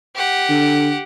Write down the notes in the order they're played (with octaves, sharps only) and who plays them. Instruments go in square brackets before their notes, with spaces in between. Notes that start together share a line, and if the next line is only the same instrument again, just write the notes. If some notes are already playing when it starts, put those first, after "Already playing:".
[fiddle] G4 F#5
[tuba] D3